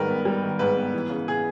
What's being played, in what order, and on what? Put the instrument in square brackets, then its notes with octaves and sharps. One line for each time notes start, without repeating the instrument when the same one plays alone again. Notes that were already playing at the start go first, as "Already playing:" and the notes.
Already playing: [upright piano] G#2 D#3 G3 A#4 B4
B3
G3
D#3
G#2 B4
B3
E3
C#3
G#4